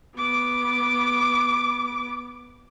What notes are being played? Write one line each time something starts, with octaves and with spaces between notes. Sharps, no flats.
B3 D6